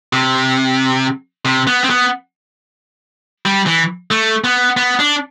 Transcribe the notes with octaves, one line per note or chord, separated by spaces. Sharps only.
C3
C3
B3
C4
B3
G3
E3
A3
B3
B3
D4